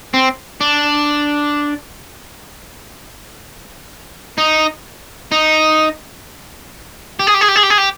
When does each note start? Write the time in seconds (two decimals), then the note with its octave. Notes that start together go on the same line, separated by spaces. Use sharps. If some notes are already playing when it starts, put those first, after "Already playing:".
0.14 C4
0.61 D4
4.38 D#4
5.32 D#4
7.19 G4
7.27 G#4
7.34 G4
7.41 G#4
7.48 G4
7.56 G#4
7.63 G4
7.70 G#4
7.78 G4